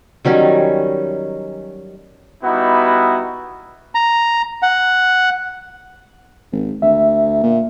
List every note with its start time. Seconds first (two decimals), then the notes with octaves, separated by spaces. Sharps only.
0.25 D#3 F#3 G3 C#4
2.44 G3 B3 D#4 E4 F#4
3.95 A#5
4.63 F#5
6.52 G#1
6.82 D2 E5
7.43 A#2